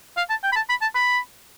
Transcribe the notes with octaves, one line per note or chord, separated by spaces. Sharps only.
F5
A5
G5
B5
A5
B5
A5
B5